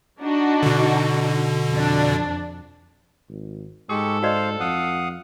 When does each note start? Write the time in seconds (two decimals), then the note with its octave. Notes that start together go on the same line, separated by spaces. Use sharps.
0.20 D4 D#4 F#4
0.63 B2 D3
1.71 F2 D4
3.29 G#1
3.90 G#2 G#3 G4 A4 C#6
4.23 F#4 C5 D5 D#5 F5
4.60 F2 F5 F#5 D#6